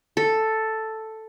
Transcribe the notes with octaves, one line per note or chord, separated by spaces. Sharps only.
A4